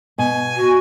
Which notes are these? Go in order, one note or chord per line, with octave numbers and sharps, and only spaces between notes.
B2 G#5
F#4